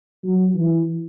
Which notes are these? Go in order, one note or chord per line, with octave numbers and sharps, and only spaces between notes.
F#3
E3